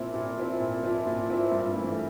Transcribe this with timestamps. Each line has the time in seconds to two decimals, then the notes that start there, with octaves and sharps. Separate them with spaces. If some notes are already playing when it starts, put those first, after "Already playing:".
Already playing: A#2 F3 C4 E4
0.14 A#2
0.37 F3 C4 E4
0.60 A#2
0.83 F3 C4 E4
1.07 A#2
1.29 F3 C4 E4
1.52 G2
1.76 E3 A3